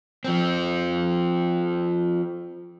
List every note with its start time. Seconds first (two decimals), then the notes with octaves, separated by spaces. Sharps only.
0.24 F3 C4